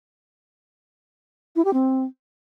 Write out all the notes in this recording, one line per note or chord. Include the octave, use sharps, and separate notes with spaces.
E4
G4
C4